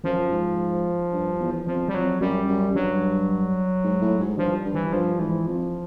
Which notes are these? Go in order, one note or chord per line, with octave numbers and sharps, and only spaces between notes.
F#2 F3
G#2
G2
E2
F2 F3
G3
F2 F#3
F#2 G3
F#2
G2 F#3
G#2
A2
G#2
G2 F3
G2
E3
G2 F3
G#2 E3
F2 F3